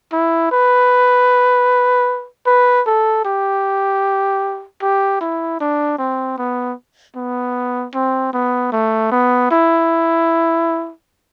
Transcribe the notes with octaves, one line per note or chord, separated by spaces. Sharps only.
E4
B4
B4
A4
G4
G4
E4
D4
C4
B3
B3
C4
B3
A3
B3
E4